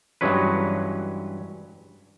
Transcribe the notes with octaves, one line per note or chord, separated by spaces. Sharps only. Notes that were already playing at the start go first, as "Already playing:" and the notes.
G2 E3 F#3 G#3 C#4 B4